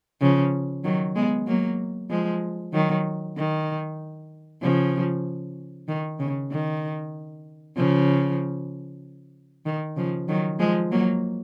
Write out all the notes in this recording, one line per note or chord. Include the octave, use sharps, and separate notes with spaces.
C#3 F3
D#3 F#3
G#3 B3
F#3 A#3
F3 G#3
D#3 F#3
D#3
C#3 F3
D#3
C#3
D#3
C#3 F3
D#3
C#3 F3
D#3 F#3
F3 G#3
F#3 A#3